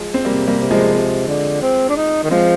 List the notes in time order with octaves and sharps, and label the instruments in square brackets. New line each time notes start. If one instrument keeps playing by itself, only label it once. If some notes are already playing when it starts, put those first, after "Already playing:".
Already playing: [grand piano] F3 G#3
C4
[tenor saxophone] C3 [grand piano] G3 A#3
[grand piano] G3 A#3
[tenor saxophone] C3
[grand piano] F3 G#3
[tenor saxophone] C3
D3
C4
D4
D#4
D#3
[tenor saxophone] F3 [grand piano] G#3 C4